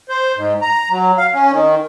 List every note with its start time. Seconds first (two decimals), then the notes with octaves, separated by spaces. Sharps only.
0.09 C5
0.36 G#2
0.62 A#5
0.90 F#3
1.18 F5
1.33 C#4
1.51 D#3